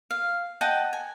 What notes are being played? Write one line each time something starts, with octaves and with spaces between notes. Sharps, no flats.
F5
D#5 F#5 G5 A5
G#5